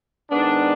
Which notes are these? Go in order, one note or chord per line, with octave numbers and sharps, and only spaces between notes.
G#2 D#3 B3 D4